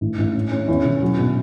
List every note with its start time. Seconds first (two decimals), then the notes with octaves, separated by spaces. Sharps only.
0.01 A1
0.18 A1
0.35 C#4
0.52 C#4
0.68 E2
0.85 E1
1.02 F#3
1.19 B2